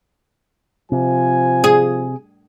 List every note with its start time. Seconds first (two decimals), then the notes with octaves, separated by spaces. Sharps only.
0.92 C3 F3 G#5
1.64 G#4